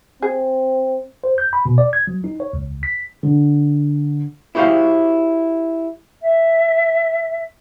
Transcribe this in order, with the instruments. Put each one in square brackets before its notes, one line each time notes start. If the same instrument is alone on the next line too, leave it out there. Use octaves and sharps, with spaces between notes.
[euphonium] C4 [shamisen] G#4
[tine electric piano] C5
G6
B5
B2
D5
G#6
F#3
D#4
C#5
C#2
B6
[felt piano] D3
[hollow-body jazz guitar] E4 F#4 G4 C5 F5
[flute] E5